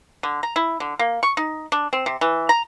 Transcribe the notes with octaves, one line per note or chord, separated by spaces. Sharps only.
D3
A#5
E4
D3
A#3
C#6
D#4
D4
C4
C3
E3
A#5